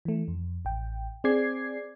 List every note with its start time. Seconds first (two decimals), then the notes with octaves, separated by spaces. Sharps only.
0.05 E3 A3
0.28 F2
0.65 A1 G5
1.24 C4 G#4 D5 D6 G#6 C7